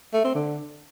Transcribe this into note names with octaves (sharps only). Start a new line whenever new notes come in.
A3
C4
D3